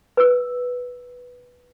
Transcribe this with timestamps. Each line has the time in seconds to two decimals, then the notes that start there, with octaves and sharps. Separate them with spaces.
0.17 B4 E6